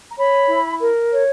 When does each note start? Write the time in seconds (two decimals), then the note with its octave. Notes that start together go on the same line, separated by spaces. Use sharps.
0.11 A#5
0.17 C#5 B5
0.48 E4
0.80 A#4
1.11 C#5